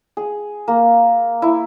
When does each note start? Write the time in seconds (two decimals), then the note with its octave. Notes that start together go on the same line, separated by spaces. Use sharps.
0.17 G#4
0.68 A#3
1.42 E4